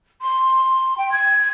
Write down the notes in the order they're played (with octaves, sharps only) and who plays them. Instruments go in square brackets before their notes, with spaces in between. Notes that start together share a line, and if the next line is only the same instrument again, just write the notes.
[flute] C6
G5
G#6